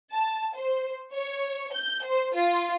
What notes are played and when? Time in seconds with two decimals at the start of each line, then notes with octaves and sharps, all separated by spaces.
0.12 A5
0.56 C5
1.14 C#5
1.74 G6
2.04 C5
2.35 F4